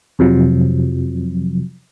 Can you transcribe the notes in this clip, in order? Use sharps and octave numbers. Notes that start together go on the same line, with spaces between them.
F2 C3 F3 F#3